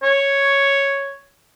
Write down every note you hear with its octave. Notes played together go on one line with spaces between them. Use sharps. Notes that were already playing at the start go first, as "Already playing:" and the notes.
C#5